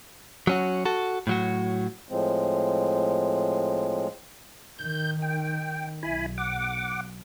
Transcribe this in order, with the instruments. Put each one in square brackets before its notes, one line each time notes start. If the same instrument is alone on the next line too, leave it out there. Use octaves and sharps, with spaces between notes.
[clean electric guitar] F#3 C#4 F#4
F#4 A4
A2 F#3 F#4
[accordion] A2 F3 G#3 C4
[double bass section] D#3 [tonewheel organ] G6
[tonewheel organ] G5
[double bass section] B1 [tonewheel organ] E4 G#5 B5
[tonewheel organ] F#5 D6